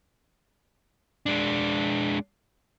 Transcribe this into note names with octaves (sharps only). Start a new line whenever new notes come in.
G#3 D4